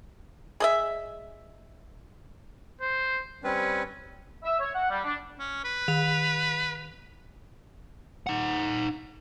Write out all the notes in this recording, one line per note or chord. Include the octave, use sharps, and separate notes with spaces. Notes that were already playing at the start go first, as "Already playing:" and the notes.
G#4 D#5 E5
C5
G3 C4 C#4 B4
E5
C#5
F#5
G3
D4
C#4
B4
D#3 F7
D#4 F#5